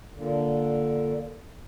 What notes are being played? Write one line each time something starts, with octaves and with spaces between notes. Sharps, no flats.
A#2 D3